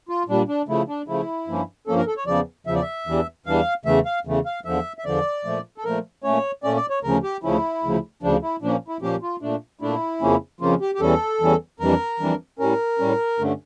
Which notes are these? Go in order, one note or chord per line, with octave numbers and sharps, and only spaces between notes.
F4
A#2 G3 D4
D4
C#3 F3 A3 E4
D4
C#3 F3 A3 E4
G2 F3 A#3 C#4
G2 F3 A#3 C#4 A4
A#4
A4
C#5
E2 C#3 F3 D5
E2 C#3 F3 E5
D5
E5
E2 E3 G3 D4
E2 E3 G3 D4 F5
E2 C#3 E3 A3 E5
F5
E2 C#3 E3 A3
F5
E2 D3 F3 E5
E5
E2 D3 F3 D5
A#2 F3 A3
A4
A#2 F3 A3 A#4
A#2 A3 C#4 C#5
A#2 A3 C#4 D5
D5
C#5
D2 C#3 F3 C#4 A#4
G4
D2 C#3 F3 C#4 E4
D2 C#3 F3
D2 C#3 F3 D4
E4
A#2 F3 A#3 C#4 D4
E4
A#2 F3 A#3 C#4 G4
F4
A#2 A3 D4
A#2 A3 D4 E4
F2 C#3 F3 A#3 C#4
F2 C#3 F3 A#3 C#4 F4
G4
G4
E2 E3 G3 C#4 A4
E2 E3 G3 C#4
F2 E3 G3 D4 A#4
F2 E3 G3 D4
A2 G3 C#4 A#4
A2 G3 C#4
G2 D3 A3 C#4